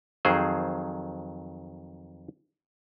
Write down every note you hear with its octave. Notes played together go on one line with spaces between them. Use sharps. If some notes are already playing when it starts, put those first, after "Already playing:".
F2 D#3 F#3 G#4 C5